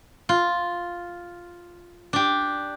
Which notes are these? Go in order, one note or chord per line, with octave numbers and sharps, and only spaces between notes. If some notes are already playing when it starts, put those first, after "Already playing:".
F4
D4 G4